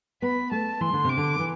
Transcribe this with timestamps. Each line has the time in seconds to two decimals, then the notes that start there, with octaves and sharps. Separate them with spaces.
0.22 B3 B5
0.51 A3 A5
0.81 E3 C6
0.93 D3
1.04 C3 D6
1.17 D3
1.39 E3